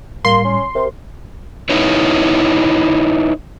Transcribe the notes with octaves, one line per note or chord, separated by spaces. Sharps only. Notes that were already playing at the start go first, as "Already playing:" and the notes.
A2 G3 A#3 C6
C#4
C3 G4 A#4 C5
D#4 E4 B4 C#5